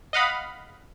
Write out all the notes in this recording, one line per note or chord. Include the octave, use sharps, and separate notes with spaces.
D#5 F5 F#5 B5